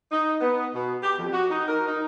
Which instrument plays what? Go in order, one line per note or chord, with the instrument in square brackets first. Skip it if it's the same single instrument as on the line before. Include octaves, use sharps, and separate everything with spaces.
[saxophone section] D#4
B3
B2
G4
F2
F#4
D#4
A#4
D#4